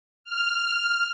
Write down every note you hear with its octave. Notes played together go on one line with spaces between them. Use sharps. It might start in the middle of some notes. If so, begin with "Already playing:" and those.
F6